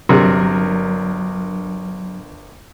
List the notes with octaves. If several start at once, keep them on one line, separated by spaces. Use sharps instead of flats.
G1 C3 F#3 D4 A#4